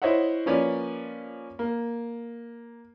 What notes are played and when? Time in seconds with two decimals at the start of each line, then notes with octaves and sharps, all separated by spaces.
0.02 E4 C5 C#5 D#5 E5 F#5
0.46 F3 A#3 C#4 B4 C#5 D5
1.59 A#3